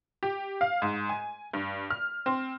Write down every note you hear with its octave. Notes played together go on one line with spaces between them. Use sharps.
G4
F5
G#2
G#5
G2
F6
C4